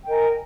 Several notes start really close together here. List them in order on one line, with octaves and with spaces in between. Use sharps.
G5 D#5 A#4 G#5